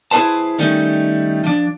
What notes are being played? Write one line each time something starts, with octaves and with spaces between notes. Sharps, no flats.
E4 G#4 A4 B4 C5 A5
D#3 G3 A3 C#4 D#4
F3 D4